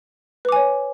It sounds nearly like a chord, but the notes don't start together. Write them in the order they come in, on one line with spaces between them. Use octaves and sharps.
B4 D6 G#5 C#5